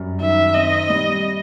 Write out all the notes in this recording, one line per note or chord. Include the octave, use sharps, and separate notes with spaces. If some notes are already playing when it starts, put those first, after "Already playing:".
Already playing: F#2 G3
D#3 E5
C4 D#5
G3